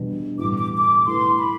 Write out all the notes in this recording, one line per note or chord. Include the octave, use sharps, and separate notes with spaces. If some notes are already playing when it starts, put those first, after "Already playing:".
Already playing: E2 B2 G3 D4
A2 G3 B3 E4 D6
D6
D6
E3 A3 E4 B4 C6
B5